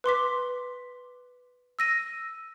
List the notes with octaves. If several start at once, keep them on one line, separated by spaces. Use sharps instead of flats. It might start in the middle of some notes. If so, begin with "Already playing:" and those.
B4 C6 D6 B6
E6 A#6 D#7